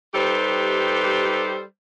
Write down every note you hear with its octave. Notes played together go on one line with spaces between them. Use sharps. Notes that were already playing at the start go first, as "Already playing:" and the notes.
G3 D#4 G4 A4 B4 C5